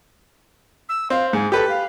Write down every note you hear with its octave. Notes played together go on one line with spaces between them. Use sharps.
E6
C4 F5
G#2 G#4
G4 A4 B4
F5